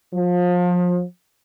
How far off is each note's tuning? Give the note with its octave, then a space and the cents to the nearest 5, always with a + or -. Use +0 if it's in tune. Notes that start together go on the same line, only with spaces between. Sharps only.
F3 +30